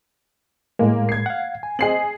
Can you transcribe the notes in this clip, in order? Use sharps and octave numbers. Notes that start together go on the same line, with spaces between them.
A2 G#3 A#3
G#6 C7
F5 F#5
G#5
C4 G#4 C5 D#5 C7 F#7